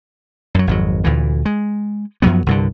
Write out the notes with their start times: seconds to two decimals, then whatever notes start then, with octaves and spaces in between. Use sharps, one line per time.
0.55 F#2 F#3
0.67 G#1 F2 F#3
1.04 D2 A#2 E3
1.45 G#3
2.22 F#2 F3 F#3 B3
2.46 C2 G2 D3